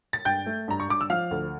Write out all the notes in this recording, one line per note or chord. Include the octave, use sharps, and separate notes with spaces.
A6
G2 G5 G6
A3
G2 A#5
C#6
G2 D6
E6
F3 F5 F6
D2